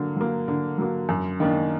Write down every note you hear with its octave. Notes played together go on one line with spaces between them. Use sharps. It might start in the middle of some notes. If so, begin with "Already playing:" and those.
Already playing: D3 F#3 A#3
F#3 A#3
D3
F#3 A#3
F#2
D#3 A#3 D4